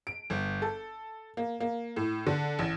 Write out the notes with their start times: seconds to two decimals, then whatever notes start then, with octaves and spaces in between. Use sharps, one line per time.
0.07 D7
0.30 G1
0.62 A4
1.37 A#3
1.60 A#3
1.96 A2
2.27 D3
2.59 A1